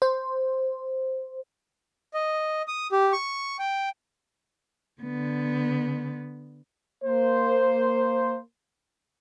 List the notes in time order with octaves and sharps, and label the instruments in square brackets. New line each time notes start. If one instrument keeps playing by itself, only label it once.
[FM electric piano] C5
[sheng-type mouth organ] D#5
D#6
G4
C#6
G5
[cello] D3 B3
[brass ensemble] A#3 C5